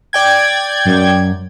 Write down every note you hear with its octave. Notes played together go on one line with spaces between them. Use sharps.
D5 G5 G#6
F#2